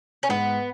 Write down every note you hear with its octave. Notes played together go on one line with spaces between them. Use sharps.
C#4
G#2 B3